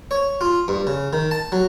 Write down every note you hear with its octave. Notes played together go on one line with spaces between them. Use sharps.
C#5
F4
G2
C#3
D#3
A5
F#3